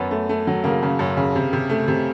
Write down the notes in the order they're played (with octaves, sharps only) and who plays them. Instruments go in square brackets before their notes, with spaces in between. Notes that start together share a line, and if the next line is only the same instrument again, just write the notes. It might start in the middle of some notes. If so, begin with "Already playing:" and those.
Already playing: [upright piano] F#2 B3
A3
A3
F#3
C#3 A#3
C#3
F#2
C#3
C3
C3
A3
C3